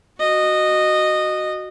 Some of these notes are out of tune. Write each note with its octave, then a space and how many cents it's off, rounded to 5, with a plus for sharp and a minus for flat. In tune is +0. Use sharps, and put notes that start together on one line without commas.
F#4 +0 D#5 -15